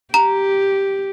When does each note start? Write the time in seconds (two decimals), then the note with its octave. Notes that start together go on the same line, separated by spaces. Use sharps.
0.14 G4 A#5